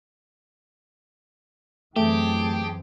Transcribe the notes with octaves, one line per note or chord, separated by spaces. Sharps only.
F#2 E3 A3 C4 G4 G#4 G5 A5